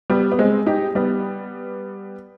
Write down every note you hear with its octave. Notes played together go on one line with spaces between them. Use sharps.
G3 B3
B3
G#3 C4
D#4 G4
G3 B3